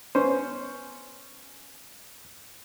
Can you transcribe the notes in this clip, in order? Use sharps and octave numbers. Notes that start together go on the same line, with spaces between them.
B3 C#4 C5